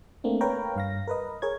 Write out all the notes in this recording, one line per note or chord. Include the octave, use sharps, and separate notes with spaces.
A3 A#3 C4 D4
A#4 B4 C#5 F5 G5 A#5
G2 F5 A#6
A#4 B4 D#5
G#4 A#4 C#5 G#6